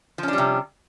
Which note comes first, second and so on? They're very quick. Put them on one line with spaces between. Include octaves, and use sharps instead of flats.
F3 C#4 D4 G3 C3